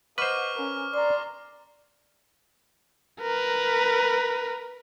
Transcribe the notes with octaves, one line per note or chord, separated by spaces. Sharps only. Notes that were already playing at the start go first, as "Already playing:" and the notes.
B4 C5 D#5 F#5 C#6 D6 F6
C#4 A#4
D5 A#5 C6 D6
A#4 B4